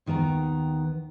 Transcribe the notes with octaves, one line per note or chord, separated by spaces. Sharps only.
D#2 D#3 B3 A5 A#5